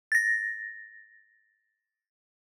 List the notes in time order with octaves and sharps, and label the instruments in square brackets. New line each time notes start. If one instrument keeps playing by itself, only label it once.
[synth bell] A6 A#6